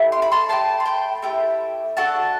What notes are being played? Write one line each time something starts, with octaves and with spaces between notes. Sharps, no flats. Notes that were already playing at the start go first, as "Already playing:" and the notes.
Already playing: A3 E4 G4
C6
B5
A5 C6
A3 E4 G4 A5 C6
C6
G5 B5
A3 E4 G4 E5 G5
D4 F#4 A4 F#5 A5